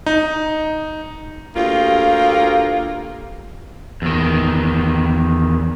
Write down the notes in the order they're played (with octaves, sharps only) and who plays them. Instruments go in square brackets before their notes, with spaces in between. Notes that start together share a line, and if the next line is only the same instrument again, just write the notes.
[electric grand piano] D#4
[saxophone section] D2 A#3 F4 G4
[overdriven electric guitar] E2 D#3